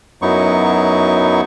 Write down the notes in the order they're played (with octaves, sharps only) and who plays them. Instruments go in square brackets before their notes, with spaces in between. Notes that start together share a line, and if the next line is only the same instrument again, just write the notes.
[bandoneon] F#2 F#3 B3 D#4 E4 C#6